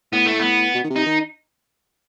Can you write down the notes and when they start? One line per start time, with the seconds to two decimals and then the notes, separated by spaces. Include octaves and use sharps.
0.12 A2 B3
0.26 A3
0.39 B3
0.75 B2
0.84 D#3
0.90 C3
0.96 D#4
1.06 D#3